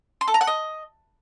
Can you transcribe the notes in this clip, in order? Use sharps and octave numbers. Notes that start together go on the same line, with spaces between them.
C6
A4
A#5
F#5
D#5